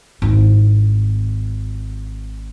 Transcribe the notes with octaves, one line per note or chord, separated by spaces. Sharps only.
G#1 E4